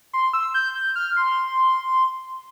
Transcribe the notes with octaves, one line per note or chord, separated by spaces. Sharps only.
C6
E6
G6
G6
F6
C6